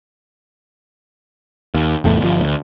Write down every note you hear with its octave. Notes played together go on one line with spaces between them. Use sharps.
D#2
F1 E2 A2 A3
G1 F3
D2